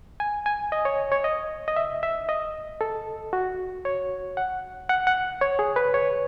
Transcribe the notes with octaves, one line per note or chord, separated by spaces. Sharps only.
G#5
G#5
D#5
C#5
C#5
D#5
D#5
E5
E5
D#5
A4
F#4
C#5
F#5
F#5
F#5
C#5
G#4
B4
C#5